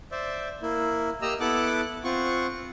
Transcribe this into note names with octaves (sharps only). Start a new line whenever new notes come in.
C5 D5 E5
A#3 E4
A#3 G4 D#5 A#5 E6
B3 E4 A4 F#5 D6 F#6
C4 F4 F#5 C#6